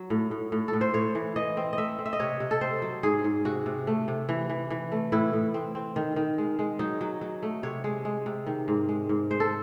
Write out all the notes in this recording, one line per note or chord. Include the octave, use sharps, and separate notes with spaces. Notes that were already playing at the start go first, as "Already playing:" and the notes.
Already playing: F#3
A2
A2
A2
A4
A2
C5
A2 C#5
E3
E3 D#5
C4
D#5
A3 E5
C4
E5
D#5
C3 C#5
C3
A4
C4 C5
F#3
G#2 G#4
G#2
C3 F#4
C3
A3
C3
E3
E3
E3
A3
A2 E4
A2
C4
C4
D#3
D#3
G#3
G#3
F#3 D#4
F#3
F#3
A3
C3 C#5
G#3
G#3
C3
D#3
G#2
G#3
G#2
G#3 C5
A4